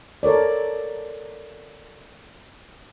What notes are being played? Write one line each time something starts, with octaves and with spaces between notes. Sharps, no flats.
A4 A#4 C#5 D5